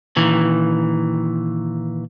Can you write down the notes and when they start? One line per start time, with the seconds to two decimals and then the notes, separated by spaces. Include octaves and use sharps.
0.16 A#2 D#3 E3